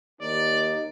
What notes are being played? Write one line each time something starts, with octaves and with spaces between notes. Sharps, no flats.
D#2 D#4 D5